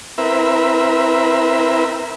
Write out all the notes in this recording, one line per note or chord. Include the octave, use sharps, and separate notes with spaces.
C4 E4 A#4 B4 E5